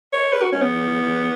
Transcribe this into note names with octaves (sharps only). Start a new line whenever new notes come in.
C#5
B4
F#4
C#4
B3